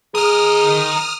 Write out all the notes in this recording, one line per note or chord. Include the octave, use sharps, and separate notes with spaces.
D#4 G#4 A#4 D#6 F6